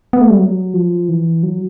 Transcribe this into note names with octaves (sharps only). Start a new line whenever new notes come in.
B3
A3
G3
F#3
F3
E3
F#3